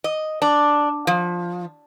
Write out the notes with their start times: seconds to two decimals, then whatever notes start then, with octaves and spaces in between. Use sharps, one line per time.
0.04 D#5
0.42 D4
1.07 F3